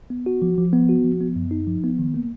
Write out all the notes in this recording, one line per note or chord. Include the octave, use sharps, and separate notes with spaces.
B3
F#4
F3
F3
B3
F#4
F3
B3
F#2
D#4
F3
B3
D#3
A#3